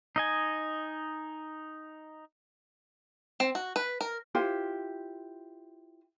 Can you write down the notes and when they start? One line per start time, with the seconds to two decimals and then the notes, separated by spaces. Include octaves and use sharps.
0.16 D#4 D#5 G#5
3.40 C4
3.55 F#4
3.76 B4
4.01 A#4
4.35 E4 F4 G4 C5